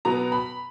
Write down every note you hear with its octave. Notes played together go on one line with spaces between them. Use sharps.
B2 F#3 B3 A#5
B5